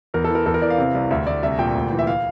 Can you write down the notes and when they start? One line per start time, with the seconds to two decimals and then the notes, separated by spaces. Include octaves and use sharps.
0.14 E2 A#4
0.24 A4
0.30 E3 A#4
0.46 E2 A4
0.54 A#4
0.62 E3 D5
0.70 F5
0.78 C3
0.94 C2
1.11 D2 E5
1.27 D2 D5
1.43 C2 E5
1.59 A#2 G5
1.75 D2
1.91 E3
1.99 E5
2.07 F5